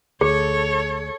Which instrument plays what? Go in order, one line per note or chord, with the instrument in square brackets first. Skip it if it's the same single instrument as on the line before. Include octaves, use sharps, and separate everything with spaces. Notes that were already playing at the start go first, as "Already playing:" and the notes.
[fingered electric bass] D2 [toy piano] G#4 [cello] A4 C#5